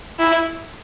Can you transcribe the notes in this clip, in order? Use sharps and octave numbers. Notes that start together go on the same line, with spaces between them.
E4